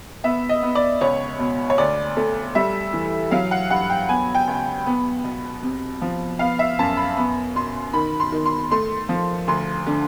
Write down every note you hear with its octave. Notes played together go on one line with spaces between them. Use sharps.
B3 E5
D#5
B3
D5
C#2 C#5
B2
C#5
D2 D5
A3
G3 E5
E3
F#3 F5
F#5
G2 F#5
G5
B3 G#5
G5
C#2
B3
B2
C3
F3
B3 F5
E5
F#2 A5
B5
B3
B2 C6
D#3 B5
C6
D#3
C6
A3 C6
F3
D2 C6
D3